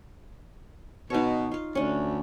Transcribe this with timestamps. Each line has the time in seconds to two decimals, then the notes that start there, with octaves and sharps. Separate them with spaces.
1.10 B2 D#4 C#5
1.52 F4 F5
1.75 D2 C#4 D4